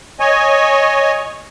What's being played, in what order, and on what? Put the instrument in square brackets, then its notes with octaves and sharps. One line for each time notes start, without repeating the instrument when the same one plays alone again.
[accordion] C#5 D#5 G#5